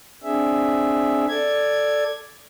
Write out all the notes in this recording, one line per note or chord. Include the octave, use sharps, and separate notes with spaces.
C4 D4 G#4 E5
A4 D5 G#6